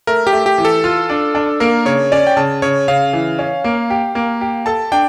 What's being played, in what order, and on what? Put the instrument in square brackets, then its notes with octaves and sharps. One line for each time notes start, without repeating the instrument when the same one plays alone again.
[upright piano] A3 [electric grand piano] A#4
[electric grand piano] G4
[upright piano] A3
[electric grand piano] G4
[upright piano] E3
[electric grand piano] A4
[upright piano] F4
D4
D4
[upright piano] A#3 [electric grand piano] A#4
[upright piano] C#3 [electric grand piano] C#5
[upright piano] C#4 [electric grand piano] D5
[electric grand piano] G5
[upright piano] C#3 [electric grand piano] A5
[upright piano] C#3 [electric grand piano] C#5
[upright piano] C#3 [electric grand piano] F5
[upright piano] E3
C#4
A#3
G4
A#3
G4
[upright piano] A4 [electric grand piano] A5
[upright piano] D4 [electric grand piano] G5